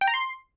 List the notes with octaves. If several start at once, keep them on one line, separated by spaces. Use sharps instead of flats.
G5
A#5
C6